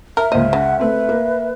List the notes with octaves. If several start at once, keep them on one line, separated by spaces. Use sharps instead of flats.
A#4 E5 F6
C#2 A#3 C5 D#5
C#3 F#5
A3 C4 B4
A#3